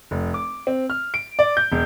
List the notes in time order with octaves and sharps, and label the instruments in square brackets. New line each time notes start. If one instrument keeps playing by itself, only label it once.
[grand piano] F1
D6
C4
F6
D7
D5
G6
E1